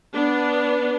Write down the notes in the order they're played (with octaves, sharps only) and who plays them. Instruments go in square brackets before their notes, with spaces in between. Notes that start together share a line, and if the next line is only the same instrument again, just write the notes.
[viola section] B3 D4